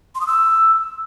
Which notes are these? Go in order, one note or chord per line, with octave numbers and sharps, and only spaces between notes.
C6
D#6
E6